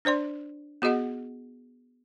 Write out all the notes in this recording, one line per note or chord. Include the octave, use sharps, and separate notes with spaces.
D4 C5 D5 C6
B3 F#4 G#4 D#5 F#5